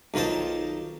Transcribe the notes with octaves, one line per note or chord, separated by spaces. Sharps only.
B1 D#3 F4 C5 A5